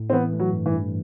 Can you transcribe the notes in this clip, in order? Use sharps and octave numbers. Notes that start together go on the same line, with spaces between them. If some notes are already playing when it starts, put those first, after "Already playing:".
Already playing: A2
C4
E3 B3
A3
F#3
G2
E3
G2